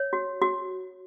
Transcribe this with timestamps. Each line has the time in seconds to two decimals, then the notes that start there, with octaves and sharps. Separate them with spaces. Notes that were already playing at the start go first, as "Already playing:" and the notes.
Already playing: C#5
0.13 F#4
0.42 F#4